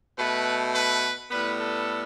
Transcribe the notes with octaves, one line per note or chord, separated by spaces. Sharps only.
B2 A3 B4
B4
A2 G3 B3 B4
A4